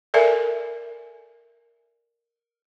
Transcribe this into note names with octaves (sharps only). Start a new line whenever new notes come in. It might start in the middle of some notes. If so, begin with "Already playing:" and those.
A4 A#4 D5 E5 G#5